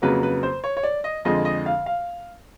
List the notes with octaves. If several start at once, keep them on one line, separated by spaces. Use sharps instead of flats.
F2 C#3 F#3 A#3 B4
B4
C5
C#5
C#5
D5
D#5
F2 D3 F3 G#3 D#5
D#5
F5
F5